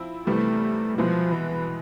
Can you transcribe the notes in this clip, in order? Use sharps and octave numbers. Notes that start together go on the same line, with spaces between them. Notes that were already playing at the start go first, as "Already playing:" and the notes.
Already playing: F3 C4 E4
C3 E3 G3 A3 B3
B2 F3 G#3 B3 E4
E3